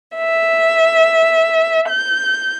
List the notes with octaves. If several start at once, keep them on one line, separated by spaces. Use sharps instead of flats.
E5
G6